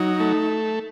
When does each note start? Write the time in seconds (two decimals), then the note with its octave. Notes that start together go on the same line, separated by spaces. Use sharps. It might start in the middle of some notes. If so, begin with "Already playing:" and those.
Already playing: F#3 D#4
0.20 A3